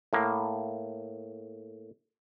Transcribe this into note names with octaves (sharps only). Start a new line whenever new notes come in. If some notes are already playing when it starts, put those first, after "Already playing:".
A2 A#3